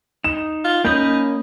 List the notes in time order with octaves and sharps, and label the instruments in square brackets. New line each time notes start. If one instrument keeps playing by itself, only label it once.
[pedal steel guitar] D#4 [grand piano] E7
[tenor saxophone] F4
[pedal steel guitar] A#3 B5 D#6 [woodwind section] C#4 [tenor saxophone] D#4 [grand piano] G6